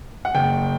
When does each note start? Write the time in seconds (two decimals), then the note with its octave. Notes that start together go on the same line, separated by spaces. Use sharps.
0.25 F#5
0.35 F#1 G5